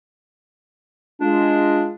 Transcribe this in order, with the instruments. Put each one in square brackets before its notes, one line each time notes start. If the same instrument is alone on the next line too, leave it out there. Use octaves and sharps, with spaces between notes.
[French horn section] G#3 F4 [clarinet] D4